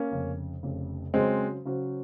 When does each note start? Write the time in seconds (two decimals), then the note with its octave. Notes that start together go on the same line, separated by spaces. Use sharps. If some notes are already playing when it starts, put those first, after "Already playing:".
Already playing: A#3 C#4
0.11 F1 F2 C#3
0.63 F1 F2 C#3
1.14 C#3 F#3 G#3 C4 C#4 F#4 C5
1.65 C#3 F#3 C#4 F#4 C5